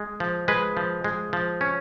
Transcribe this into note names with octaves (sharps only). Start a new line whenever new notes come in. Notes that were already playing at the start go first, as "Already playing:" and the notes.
Already playing: G#3
F3
G#3 B4
F3
G#3
F3
C#4